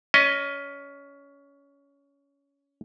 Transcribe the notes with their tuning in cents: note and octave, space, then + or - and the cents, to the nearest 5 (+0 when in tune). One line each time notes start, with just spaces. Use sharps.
C#4 +20 D#5 +0